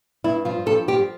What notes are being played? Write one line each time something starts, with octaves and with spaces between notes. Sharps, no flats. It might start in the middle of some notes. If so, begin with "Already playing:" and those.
G2 E4
F3 F4
G2 A4
F3 G4